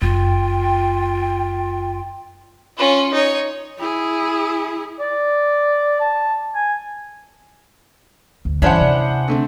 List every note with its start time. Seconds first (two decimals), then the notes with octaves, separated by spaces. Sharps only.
0.02 F#1 F4 G5
2.78 C#4 F4
3.13 D#4 C#5
3.79 E4 G#4
5.00 D5
6.00 A5
6.55 G#5
8.45 D2
8.62 G2 E3 C#4 D4 E4 G#4 C5 F#5
8.81 C3
9.28 D3 A3 C4